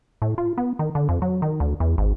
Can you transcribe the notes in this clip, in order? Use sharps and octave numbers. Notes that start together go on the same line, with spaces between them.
A2
F4
B3
D#3
D3
F2
F#3
D#3
D2
E2
G#1